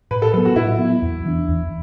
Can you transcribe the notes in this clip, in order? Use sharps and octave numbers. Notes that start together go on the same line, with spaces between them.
A2 B4
A4
F#3 B3 A4
F#4
A2 E4
F#3 B3
E2
E3 D4
E2